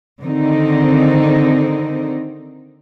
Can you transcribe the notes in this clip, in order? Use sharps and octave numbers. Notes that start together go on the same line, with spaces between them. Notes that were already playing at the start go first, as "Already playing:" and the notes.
D3 D#3 C4 D#4